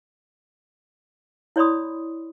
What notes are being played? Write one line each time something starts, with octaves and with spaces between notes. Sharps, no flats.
E4 C#5 D5 B5 C6 D#6